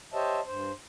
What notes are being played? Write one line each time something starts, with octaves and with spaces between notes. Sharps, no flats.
G4 C5 C#5 D#5 E5 A5
G2 C5